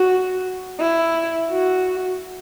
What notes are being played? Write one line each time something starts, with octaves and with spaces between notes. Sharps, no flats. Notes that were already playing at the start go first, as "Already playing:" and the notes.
Already playing: F#4
E4
F#4